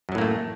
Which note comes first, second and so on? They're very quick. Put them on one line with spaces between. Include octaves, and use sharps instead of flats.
F#2 F#3 A2 A#3 A3